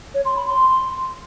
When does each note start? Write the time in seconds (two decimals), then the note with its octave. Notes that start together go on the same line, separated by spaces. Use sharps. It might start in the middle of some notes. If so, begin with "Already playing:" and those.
0.14 C#5
0.25 C6
0.36 B5
0.47 C6